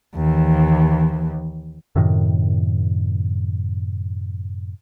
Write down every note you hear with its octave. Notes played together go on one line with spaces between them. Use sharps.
D#2 E3
F#2 A2 C3 D#3